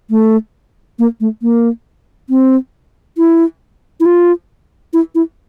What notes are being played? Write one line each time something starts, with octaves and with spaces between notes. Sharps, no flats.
A3
A#3
A3
A#3
C4
E4
E4
F4
E4
E4